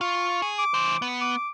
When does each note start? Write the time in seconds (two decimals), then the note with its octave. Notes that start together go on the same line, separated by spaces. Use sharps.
0.01 F4 C#6
0.42 G#4
0.59 D6
0.74 E3 C5
1.02 B3
1.21 D6